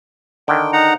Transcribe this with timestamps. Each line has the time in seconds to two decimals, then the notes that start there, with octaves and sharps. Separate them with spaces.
0.48 D3 D#3 G5
0.73 D#4 F#5 A#5